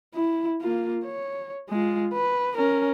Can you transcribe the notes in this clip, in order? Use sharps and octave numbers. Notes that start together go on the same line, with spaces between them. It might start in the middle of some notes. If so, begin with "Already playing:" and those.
E4
A#3 F4
C#5
G#3 F4
B4
C#4 A#4